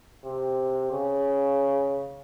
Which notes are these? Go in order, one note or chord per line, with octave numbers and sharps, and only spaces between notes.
C3
C#3